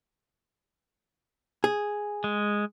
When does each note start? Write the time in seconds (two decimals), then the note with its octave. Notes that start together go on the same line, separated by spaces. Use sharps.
1.64 G#4
2.24 G#3